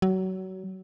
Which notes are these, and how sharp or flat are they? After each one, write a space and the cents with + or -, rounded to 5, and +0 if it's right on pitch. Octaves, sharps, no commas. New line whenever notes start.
F#3 +25